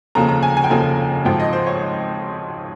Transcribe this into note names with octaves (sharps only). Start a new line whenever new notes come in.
F1 D#2 C#3 F3 A#5
A#5
G#5
G#5
G5
F1 D#2 C#3 F3 G#5
G#1 G#2 F3 G5
D#5
C5
C#5